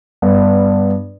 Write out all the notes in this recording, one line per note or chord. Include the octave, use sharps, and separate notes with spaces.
G2 B3 D4